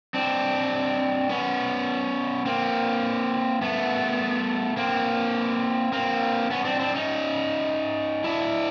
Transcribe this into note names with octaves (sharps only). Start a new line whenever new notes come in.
C4 D4
B3 C#4
A#3 C4
A3 B3
A#3 C4
A#3 C4
B3 C#4
C4 D4
C4 D4
C#4 D#4
D4 E4